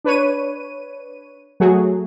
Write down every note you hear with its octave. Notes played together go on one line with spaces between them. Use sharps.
D4 B4 C#5 D#7
F#3 A3 F#4 G#4